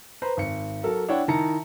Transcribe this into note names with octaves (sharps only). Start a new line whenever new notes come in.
B4 C5 A#5
G#1 C#7
F#3 A4 A#4
D4 E4 C#5 F#5 G5
D#3 E4 A5 A#5 C#7